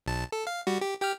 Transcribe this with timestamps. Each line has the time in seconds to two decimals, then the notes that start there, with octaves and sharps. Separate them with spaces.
0.06 B1 A5
0.32 A4
0.47 F5
0.67 G3 F#4
0.81 G4
1.00 G4 G5 F6